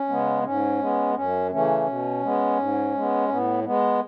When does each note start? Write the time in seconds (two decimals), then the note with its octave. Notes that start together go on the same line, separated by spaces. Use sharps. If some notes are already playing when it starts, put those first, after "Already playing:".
Already playing: C#4
0.09 C#3 G#3 B3
0.44 G#2 C#4
0.79 G#3 B3
1.15 F#2 C#4
1.51 C#3 E3 A3 C#4
1.86 B2
2.22 G#3 B3
2.58 G#2
2.94 G#3 B3
3.29 A2 B3
3.64 G#3 B3